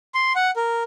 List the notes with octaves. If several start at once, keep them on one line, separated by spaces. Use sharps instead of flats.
C6
F#5
A#4